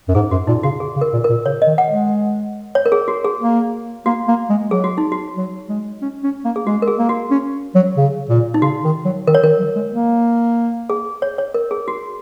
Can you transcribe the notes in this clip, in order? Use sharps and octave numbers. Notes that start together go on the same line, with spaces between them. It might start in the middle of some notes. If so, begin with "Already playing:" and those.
F#2
G#2 G#4
F#2 F#4
A#2 D#4
C#3 F#4
G#4
C#3
A#4
A#2
A#4
A#2
C#3 C#5
D#5
D#3
F#5
G#3
C#5
A#4
G#4
F#4
G#4
A#3
A#3 F#4
A#3
G#3
F#3 G#4
F#4
D#4
F#4
F#3
G#3
C#4
C#4
A#3
G#4
G#3 F#4
A#4
G#4
A#3
F#4
C#4
F#3
C#3
A#2
D#4
C#3 F#4
D#3
F#3
D#3 A#4
C#5
D#3 A#4
F#3
G#3
A#3
G#4
C#5
C#5
A#4
G#4
F#4